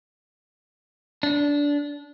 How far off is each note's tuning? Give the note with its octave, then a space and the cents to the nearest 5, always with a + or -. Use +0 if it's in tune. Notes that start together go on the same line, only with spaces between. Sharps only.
D4 -20